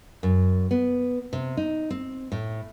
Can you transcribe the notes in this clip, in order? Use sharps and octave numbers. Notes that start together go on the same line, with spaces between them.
F#2
B3
C3
D#4
C4
A2